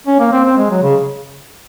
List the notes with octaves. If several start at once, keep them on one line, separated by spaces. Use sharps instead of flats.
C#4
A#3
C4
C4
G#3
F#3
C#3